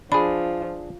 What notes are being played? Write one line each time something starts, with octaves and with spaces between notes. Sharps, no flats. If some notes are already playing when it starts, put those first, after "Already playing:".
F3 D4 G#4 B5